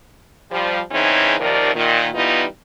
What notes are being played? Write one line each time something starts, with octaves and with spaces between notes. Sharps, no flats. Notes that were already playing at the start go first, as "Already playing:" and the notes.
F3 G3
E2 C#3 E3 C4 C#4 D#4
D#2 C3 D#3 F3 A#4 D5
A#2 D#3
E3 G3 B3 D#4 F4 B4